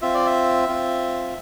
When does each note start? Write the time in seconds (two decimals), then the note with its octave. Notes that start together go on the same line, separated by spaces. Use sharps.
0.02 C4 F4 E5
0.15 D5
0.26 E5
0.68 C4 F4